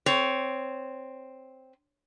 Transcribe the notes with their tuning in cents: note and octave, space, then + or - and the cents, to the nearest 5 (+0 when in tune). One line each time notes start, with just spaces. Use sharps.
C4 +0 C#5 +15